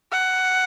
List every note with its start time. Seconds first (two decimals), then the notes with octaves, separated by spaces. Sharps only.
0.12 F#5